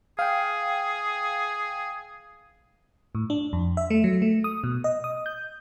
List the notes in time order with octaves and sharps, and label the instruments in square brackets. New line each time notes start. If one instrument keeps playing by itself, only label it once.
[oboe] G#4 [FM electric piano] F5 G5
[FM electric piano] A2
D4
F2
E5
A3
F#3
A3
D#6
B2
D#5
D#6
G6